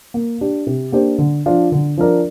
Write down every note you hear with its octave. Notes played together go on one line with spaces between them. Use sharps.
A#3
D4 G4
C3
A#3 D4 G4 C5
D3
F3 D4 F4
D3
F3 D4 A#4 D5